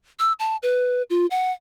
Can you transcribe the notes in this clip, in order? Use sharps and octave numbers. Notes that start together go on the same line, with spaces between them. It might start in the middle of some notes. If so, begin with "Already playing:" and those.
E6
A5
B4
F4
F#5